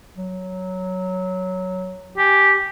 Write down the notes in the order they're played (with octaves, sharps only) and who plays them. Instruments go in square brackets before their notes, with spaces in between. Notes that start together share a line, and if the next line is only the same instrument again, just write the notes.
[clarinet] F#3
[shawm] G4 [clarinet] G#5